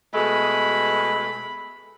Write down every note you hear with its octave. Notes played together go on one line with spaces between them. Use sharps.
B2 G#3 A3 B5